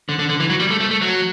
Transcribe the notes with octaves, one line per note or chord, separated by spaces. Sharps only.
D3
D3
D3
E3
F#3
G3
A3
A3
A3
F#3